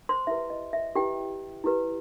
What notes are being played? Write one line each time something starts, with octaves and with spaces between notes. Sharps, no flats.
C5 C6
E4 G4 B4 E5
D#5
E5
E4 G4 B4 G5
E4 G4 B4